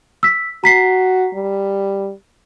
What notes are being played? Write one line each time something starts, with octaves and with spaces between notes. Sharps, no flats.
E6 B6
F#4 A#5 B6 C7
G3